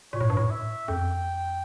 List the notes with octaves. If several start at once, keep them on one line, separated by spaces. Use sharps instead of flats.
A#2 C#5
A2
G2
A2
E5
F2 G5